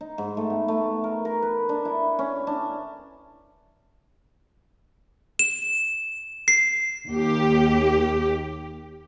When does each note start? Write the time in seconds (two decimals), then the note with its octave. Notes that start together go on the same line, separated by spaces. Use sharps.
0.01 D#4
0.18 G#2
0.37 A3
0.50 B3
0.68 A3
1.04 A#4
1.25 A#4
1.42 B4
1.69 D4
1.85 E4
2.19 C#4
2.47 D4
5.39 E7
6.48 C7
7.10 D#2 G4